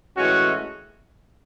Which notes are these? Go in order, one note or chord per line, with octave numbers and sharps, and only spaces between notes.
A2 E3 G#3 C#4 F#4